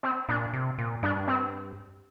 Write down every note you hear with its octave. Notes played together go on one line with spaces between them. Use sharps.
C4
A#2 D4
C3
A#2
G2 D4
C4